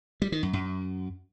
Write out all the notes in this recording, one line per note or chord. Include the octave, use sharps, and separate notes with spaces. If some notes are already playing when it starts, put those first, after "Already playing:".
G3
D#3
F#2
F#2